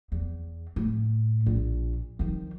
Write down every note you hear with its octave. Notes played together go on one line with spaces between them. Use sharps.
E2
A2
A#1
D#3 F3